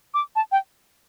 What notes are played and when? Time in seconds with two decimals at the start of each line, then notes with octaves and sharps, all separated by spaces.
0.14 D6
0.36 A5
0.52 G5